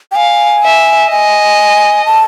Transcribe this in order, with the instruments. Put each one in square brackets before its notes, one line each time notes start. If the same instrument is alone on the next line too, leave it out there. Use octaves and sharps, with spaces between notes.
[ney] G5
[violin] F5 [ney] G#5
[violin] E5
[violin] D#5 [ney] G#5
[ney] A5